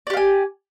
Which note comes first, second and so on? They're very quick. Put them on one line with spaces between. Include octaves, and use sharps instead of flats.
D5 G4 F5 G#5